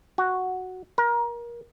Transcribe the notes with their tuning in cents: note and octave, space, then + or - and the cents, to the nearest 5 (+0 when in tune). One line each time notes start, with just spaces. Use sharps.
F#4 +0
A#4 +25